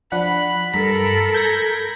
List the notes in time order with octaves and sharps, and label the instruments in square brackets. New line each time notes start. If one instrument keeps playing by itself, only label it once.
[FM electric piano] F3 D4 F#5 [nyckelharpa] B5
[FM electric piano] G2 A#5 B6 [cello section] A4 A#4
[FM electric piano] G6 G#6 A#6